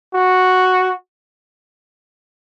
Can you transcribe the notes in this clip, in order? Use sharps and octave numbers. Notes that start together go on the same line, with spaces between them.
F#4